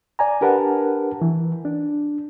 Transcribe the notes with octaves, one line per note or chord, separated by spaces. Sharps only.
D5 G#5 A#5
D4 G4 A#4 B4 F#5 A5
E3
D4